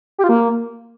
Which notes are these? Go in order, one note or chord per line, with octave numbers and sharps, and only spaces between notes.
G4
F4
A#3